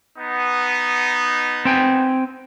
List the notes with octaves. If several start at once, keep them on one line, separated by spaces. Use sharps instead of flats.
B3 D#4
C4 G5 G#5